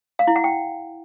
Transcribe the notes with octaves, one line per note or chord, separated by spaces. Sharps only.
F5
E4
F#5
G5